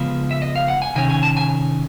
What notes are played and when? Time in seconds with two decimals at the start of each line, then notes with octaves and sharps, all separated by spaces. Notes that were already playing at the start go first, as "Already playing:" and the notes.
Already playing: C#3 F3 G#3 B3
0.31 E5
0.42 D#5
0.56 F5
0.68 F#5
0.82 G#5
0.95 C3 D#3 C#4 G#5
1.10 G#5
1.23 A5
1.37 G#5